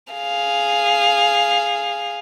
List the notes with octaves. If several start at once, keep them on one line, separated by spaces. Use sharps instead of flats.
G#4 F5